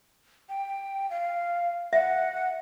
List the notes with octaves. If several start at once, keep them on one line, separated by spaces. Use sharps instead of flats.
G5
F5
E5 F#5